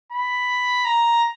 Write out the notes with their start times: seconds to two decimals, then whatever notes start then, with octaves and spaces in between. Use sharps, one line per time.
0.13 B5
0.85 A#5